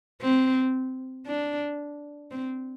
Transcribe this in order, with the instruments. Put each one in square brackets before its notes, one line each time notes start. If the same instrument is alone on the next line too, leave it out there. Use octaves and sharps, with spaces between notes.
[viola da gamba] C4
D4
C4